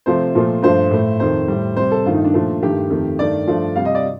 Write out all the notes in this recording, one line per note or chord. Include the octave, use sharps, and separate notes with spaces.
C3 F3 A3 C5
A#2 F3 A3
G2 F3 A3 C5
A2 A3
F2 D#3 A3 C5
A2 G3
C3 G3 C5
A4
G2 D#3 A3 F4
D#4
D4
A#2 F3 A3
G2 D#3 A3 G4
F2 D#3 A3
G2 D#3 A3 D5
G2 F3 A3
C3 G3 F5
D#5
D5